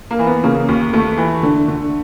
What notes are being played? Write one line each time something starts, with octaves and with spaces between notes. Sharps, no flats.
A#3
E3
B3
C#3 A#3
D#2
D#2 A3
E3
D3
D3